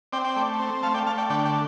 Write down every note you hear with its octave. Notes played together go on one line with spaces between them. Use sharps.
C4 D5 G5
D5 G5
A3
C4
A3 F5 A5
D5 G5
A3 F5 A5
D5 G5
D3 D5 G5
D5 G5